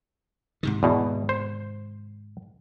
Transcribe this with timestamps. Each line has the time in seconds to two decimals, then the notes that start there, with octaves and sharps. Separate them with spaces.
0.63 G#2 C3 D#3
0.83 E2 B2
1.29 C5